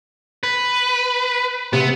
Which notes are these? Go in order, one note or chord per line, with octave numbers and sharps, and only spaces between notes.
B4
C3 B3